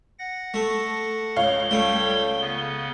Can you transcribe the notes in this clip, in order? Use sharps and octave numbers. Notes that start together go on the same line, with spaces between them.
F#5 A#6
A3
C#2 C#5 F5 G7
G3 A3 G5 G#6
C#3 B3